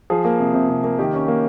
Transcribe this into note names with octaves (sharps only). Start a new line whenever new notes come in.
F3 G#4
A#3
C3
C3
C3
A#3
D#3 G4
C#4
A#3